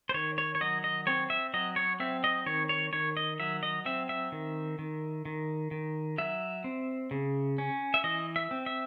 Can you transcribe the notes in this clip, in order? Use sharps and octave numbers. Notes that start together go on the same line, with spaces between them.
C5
D#3 C#5
C#5
C#5
F#3 D#5
D#5
C4 C#5
E5
F#3 D#5
C#5
C4 E5
D#5
D#3 C#5
C#5
D#3 C#5
D#5
F#3 E5
D#5
C4 E5
E5
D#3
D#3
D#3
D#3
F#3 E5
C4
C#3
C#4
E5
E3 D#5
E5
C4
E5